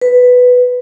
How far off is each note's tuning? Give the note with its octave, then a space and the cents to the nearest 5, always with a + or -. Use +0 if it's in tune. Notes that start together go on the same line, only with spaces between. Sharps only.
B4 +5